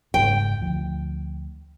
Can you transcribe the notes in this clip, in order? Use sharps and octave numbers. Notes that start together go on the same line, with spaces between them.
F#1 G#2 G5
D2 F3